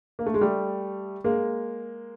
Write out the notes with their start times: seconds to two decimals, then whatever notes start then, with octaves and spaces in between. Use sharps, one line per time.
0.19 A#3
0.26 A3
0.34 G#3
0.41 G3 A3
1.24 G#3 A#3